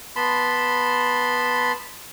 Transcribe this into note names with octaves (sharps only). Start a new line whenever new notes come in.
B3 A5 B5 C6